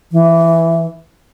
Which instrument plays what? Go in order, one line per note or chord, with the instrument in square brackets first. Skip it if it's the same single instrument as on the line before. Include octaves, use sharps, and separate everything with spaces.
[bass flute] E3